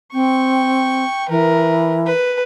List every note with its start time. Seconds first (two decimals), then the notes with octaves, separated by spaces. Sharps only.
0.14 C4 G5 C#6
1.29 E3 A#4 B4
2.06 B4